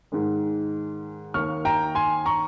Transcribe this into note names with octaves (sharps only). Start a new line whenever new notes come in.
G#2 D#3 G#3
D#2 D#3 A#3 C#6 F6
G5 A#5
G#5 C6
A#5 C#6